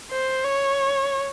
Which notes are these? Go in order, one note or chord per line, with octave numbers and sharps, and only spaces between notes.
C5
C#5